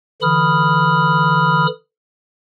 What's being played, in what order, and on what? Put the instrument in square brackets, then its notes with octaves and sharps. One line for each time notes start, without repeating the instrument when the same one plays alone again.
[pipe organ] D3 E3 B5 D#6 F6